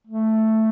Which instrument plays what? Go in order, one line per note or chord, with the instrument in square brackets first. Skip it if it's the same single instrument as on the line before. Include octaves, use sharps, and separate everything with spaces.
[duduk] A3